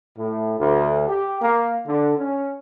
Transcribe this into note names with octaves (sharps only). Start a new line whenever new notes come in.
A2
D2
G4
A#3
D3
C#4